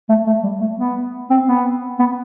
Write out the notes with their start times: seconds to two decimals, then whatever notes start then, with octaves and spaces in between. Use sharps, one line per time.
0.09 A3
0.27 A3
0.43 G3
0.61 A3
0.79 B3
1.30 C4
1.48 B3
1.99 B3